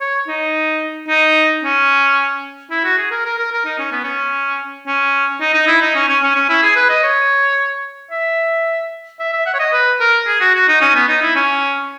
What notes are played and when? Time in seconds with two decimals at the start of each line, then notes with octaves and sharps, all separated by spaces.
0.01 C#5
0.28 D#4
1.09 D#4
1.63 C#4
2.71 E4
2.84 F#4
2.98 G#4
3.11 A#4
3.25 A#4
3.38 A#4
3.52 A#4
3.65 D#4
3.79 C#4
3.92 B3
4.04 C#4
4.87 C#4
5.41 D#4
5.54 D#4
5.68 E4
5.82 D#4
5.96 C#4
6.08 C#4
6.23 C#4
6.36 C#4
6.49 E4
6.63 G#4
6.76 B4
6.90 D#5
7.03 C#5
8.11 E5
9.20 E5
9.33 E5
9.46 F#5
9.54 C#5
9.59 D#5
9.73 B4
10.00 A#4
10.28 G#4
10.41 F#4
10.55 F#4
10.69 D#4
10.82 C#4
10.95 B3
11.09 D#4
11.22 E4
11.36 C#4